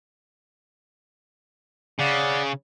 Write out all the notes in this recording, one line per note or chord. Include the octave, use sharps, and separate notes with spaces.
C#3 D5 F#5